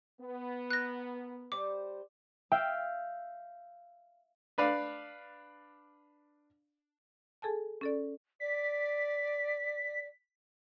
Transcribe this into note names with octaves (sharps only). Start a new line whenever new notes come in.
B3
A#4 F#6 A#6
G3 C5 D6
E5 F5 G5 G6
D4 B4 D5 F5
G#4 A4 G#5 A5
C#4 A4 D5
D5 B6